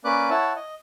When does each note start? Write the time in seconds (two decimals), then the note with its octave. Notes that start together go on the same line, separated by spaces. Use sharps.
0.05 A#3 C#4 B4 D5 D6 F#6
0.30 E4 C#5 E5 F#5 A5
0.56 D#5